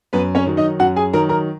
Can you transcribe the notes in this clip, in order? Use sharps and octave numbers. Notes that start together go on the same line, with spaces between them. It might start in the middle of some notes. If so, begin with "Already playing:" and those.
F#2 B3 B4
C#4 C#5
D#3 F#3
D#4 D#5
F#2 F#4 F#5
G#4 G#5
D#3 F#3 A#4 A#5
A#4 A#5